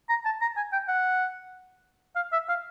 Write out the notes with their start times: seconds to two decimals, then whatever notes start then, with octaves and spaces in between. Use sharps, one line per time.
0.09 A#5
0.25 A5
0.41 A#5
0.57 G#5
0.72 G5
0.88 F#5
2.16 F5
2.32 E5
2.49 F5